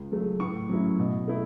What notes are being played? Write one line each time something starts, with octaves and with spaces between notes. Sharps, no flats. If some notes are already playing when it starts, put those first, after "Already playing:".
Already playing: C#2
C#3 F#3 A3
A2 C#6
F#3 C#4 E4
B2
A3 E4